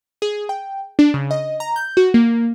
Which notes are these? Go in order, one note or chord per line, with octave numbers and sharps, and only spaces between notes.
G#4
G5
D4
C#3
D#5
A#5
G6
F#4
A#3